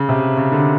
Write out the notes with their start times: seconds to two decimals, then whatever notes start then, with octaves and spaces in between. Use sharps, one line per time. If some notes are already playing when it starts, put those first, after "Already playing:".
Already playing: C#3
0.09 C3
0.37 C#3
0.52 D3